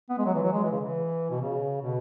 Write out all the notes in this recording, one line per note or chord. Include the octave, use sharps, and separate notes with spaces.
B3
G#3
F#3
E3
F#3
G#3
E3
C#3
E3
B2
C#3
B2